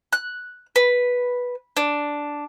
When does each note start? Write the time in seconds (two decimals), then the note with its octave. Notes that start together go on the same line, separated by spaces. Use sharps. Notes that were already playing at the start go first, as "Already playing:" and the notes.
0.13 F#6
0.76 B4
1.77 D4